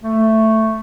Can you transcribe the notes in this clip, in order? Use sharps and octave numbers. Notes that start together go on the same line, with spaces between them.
A3